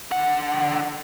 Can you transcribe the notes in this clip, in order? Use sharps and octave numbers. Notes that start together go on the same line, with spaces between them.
D3 F#5